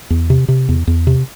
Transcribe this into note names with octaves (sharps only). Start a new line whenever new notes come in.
E2
C3
C3
E2
E2
C3